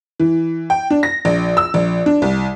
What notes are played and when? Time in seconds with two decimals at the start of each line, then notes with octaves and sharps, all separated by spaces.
0.20 E3
0.70 G5
0.90 D4
1.03 A#6
1.25 A#1
1.57 E6
1.74 A#1
2.06 D4
2.22 C2